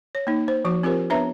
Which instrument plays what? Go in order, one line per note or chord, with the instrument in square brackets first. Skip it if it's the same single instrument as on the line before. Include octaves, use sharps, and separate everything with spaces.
[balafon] C#5
A#3 D#4
C5
F3 F#4 C#6
C4 F4 G4 A#4 C5
B3 D4 B4 C#5 E5 A#5